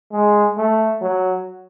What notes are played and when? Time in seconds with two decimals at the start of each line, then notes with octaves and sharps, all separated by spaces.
0.12 G#3
0.58 A3
1.02 F#3